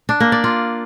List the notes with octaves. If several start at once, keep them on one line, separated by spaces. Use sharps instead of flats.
D4
A#3
D5
F4